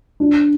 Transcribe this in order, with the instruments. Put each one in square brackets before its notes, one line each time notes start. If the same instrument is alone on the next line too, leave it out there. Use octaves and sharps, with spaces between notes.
[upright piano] D4